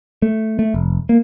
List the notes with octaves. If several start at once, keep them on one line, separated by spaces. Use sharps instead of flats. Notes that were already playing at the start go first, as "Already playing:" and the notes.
A3
A3
F1
A#3